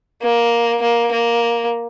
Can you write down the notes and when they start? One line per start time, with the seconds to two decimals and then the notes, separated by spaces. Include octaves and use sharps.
0.23 A#3
0.82 A#3
1.12 A#3